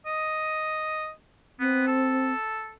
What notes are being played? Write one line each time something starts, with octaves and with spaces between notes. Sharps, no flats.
D#5
B3 C4
A4